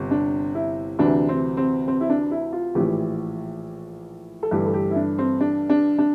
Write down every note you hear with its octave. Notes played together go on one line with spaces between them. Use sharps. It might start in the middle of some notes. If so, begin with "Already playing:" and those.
Already playing: G1 C3
D4
E4
D2 C3 E3 D4
C4
C4
C4
E4
D4
E4
F4
A#1 A2 E3 G4
A4
G1 G2 E3 A3 G4
A4
G4
E4
D4
C4
D4
D4
D4